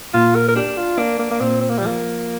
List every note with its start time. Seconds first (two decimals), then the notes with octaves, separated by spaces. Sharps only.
0.14 A#2 F4
0.35 A#4
0.49 A#4
0.56 D4 G4
0.77 F4
0.98 A#3 D4
1.19 A#3
1.31 A#3
1.40 A#2 C4
1.61 C4
1.70 A#3
1.79 G3
1.83 F3 A#3